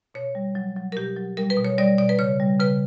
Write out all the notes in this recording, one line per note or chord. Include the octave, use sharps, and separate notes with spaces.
B2 C#5
G3
F#3
F#3
A#4
B2 G4
F#3
G3 A#4
B4
B2
C#5
G3 D5
B2 D5
B4
C#3 C#5
G3
C#3 B4